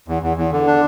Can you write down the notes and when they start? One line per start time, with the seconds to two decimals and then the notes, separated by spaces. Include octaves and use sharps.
0.08 E2
0.23 E2
0.37 E2
0.52 D3
0.67 D4